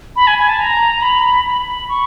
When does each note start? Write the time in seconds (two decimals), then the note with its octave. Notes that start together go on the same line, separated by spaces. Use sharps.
0.16 B5
0.27 G#5
0.38 G#5
0.49 A5
0.60 A#5
1.02 B5
1.46 B5
1.89 C#6